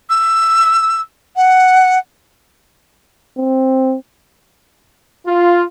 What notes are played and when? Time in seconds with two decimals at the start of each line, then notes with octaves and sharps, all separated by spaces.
0.10 E6
1.36 F#5
3.37 C4
5.26 F4